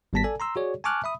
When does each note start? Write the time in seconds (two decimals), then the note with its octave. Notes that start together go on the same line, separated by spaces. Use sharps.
0.13 G#1 G3 B3 A5 A#6 B6
0.24 A4 D5 G#5
0.40 A#5 C6 E6
0.56 F#4 G#4 C#5 D5
0.84 G#5 A5 C#6 D6 F6 F#6
1.04 E5 B5 D#6